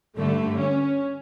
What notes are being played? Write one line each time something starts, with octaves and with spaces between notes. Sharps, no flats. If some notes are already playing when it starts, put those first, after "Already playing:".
G2 D3 A3
C#4